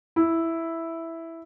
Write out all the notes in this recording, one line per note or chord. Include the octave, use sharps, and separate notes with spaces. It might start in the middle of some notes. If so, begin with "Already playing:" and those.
E4